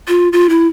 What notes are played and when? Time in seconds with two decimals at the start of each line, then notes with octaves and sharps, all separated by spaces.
0.08 F4
0.33 F4
0.49 E4